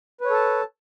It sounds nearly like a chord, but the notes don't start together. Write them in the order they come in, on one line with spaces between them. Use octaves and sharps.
B4 C#5 A4 A5